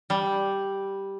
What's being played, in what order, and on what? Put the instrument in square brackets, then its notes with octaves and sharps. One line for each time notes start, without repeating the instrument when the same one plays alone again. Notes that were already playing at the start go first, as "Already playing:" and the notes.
[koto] G3